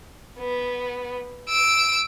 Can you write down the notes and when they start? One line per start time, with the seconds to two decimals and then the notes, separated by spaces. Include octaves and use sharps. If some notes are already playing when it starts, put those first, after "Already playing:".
0.39 B3
1.49 E6 D7